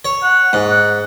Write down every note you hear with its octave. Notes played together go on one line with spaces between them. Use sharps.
C#5
F#5
G#2
F#5